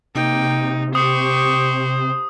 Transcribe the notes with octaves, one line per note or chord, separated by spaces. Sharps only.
C3 A#3 D#4 G5
G4 C5 C#6 D#6